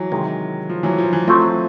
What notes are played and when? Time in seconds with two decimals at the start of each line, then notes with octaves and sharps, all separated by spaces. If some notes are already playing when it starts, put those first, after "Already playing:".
Already playing: E3 F#3
0.12 C3 D#3 G#3
0.69 F3
0.83 E3 F#3
0.98 F3
1.13 E3
1.27 F3 F#3 A3 C4